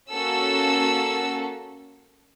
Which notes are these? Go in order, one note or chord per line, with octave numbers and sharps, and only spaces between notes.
A#3 C#4 F#4 A4 E6